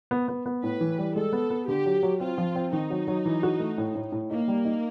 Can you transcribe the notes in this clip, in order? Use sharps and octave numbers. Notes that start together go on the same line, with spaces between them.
B3
B3
B3
A2 B4
E3
G3
G#3 A4
B3
B3
D3 G4
F#3
F#3
C4 F4
F3
C4
D#3 D#4
F#3
F#3
E3
F#4
A3
A2
A2
A2
A#3 D#4
G3
D#4